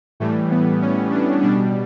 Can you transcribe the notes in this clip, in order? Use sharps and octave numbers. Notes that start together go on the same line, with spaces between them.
A2 E3 G3 A3
B3
C#4
D4
B2 G3 D4